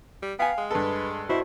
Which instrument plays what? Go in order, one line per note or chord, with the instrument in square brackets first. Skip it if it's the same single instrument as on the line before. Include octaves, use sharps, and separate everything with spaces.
[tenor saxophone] G3
[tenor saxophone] B3 [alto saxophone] F5 [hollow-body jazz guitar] G5 G#5
[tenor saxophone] G#3
[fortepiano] G2 A4 [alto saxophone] B4
[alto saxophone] E4 [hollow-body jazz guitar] F#4 C5 D#5